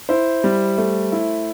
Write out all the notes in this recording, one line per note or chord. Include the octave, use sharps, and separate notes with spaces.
E4 C5
G3
A3
E4